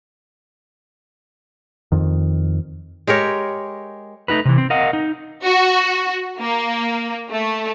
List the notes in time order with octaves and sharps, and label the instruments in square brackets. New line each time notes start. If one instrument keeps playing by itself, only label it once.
[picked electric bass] F2 D#3
[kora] G#3 G4 A#4 C#5
[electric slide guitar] A3 D#4 F#4 B4
C3 E3
C4
A#4 D#5 F5 F#5
D#4
[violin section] F#4
A#3
A3